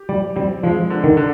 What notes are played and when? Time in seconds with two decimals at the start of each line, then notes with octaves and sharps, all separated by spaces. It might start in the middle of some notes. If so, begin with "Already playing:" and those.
Already playing: G4
0.09 G3 D5
0.36 G3 C4
0.63 F3 G#3
0.90 D3
1.04 D#3
1.17 D3